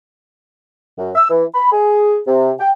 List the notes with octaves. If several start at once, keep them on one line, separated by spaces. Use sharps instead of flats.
F#2
E6
E3
B5
G#4
C3
G5